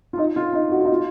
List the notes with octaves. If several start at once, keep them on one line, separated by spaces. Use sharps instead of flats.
F4
D#4
F4
D#4
F#4
F4
D#4
F4